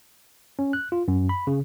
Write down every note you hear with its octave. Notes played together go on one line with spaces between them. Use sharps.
C#4
F#6
F4
F#2
B5
C#3